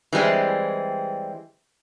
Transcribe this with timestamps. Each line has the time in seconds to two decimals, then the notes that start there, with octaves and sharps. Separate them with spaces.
0.13 E3 G3 G#3 C4